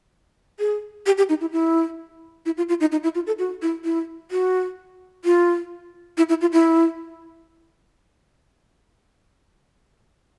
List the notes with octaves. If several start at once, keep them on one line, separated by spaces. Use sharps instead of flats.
G#4
G4
G4
D#4
E4
E4
E4
F4
F4
D#4
D#4
E4
F4
A4
F#4
E4
E4
F#4
F4
E4
E4
F4
E4